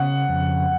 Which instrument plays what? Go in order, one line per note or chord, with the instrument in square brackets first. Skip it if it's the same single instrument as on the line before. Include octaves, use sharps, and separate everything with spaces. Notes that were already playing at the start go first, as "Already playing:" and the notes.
Already playing: [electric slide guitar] C#3 [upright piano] F#5
[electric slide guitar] F2